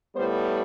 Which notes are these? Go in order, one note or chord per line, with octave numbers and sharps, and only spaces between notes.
A2 G3 B3 C5